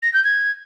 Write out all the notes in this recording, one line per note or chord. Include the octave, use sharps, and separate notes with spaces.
A#6
G6
G#6